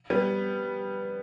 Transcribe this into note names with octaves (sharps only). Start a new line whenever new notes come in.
G3 B3